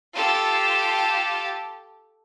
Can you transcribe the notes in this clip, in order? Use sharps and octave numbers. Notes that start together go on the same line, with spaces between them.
F4 G4 A4